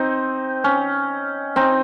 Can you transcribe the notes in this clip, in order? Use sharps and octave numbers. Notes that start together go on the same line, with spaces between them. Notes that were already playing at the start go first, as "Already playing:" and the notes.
Already playing: C4 D#4
C#4
C4 D#4